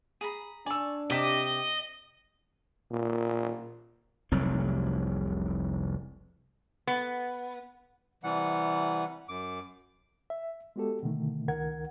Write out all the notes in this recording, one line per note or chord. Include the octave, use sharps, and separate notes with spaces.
G#4 A#5 B5
D4 D5 G#5 C#6 E6
C3 G4 D#5 D6 B6 E7
A#2
F1 C2 F#3 C4
B3
C3 E3 G3 F#5
F#2 D6
E5
G#3 B3 F#4 G4 A4
B2 D3 D#3 A3
C#2 D#3 A#4 F#5 G#6